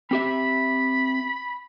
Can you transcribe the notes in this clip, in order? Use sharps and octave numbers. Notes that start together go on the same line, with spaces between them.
C4 G4 E5 B5